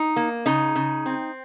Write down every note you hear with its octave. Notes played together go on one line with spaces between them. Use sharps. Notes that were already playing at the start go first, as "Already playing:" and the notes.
Already playing: D#4
A#3
C#3 D#4
C#3
C4